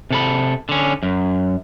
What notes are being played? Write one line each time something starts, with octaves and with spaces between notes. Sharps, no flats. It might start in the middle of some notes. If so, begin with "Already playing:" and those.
C3 A4 B5
D3 C#4
F#2